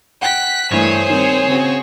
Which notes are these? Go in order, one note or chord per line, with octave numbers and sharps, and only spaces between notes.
F#5 G5 F#6 B6
G2 E3 A3 G#4 C5 C#5
D#3 G3 C4
C#3 C4 F#4